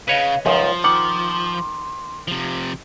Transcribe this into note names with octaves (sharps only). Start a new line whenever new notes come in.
C#3 B4 C#5 D#5 F5
C#2 F#2 D#3 F3 C6
D#3 F#5 D6
C3 F3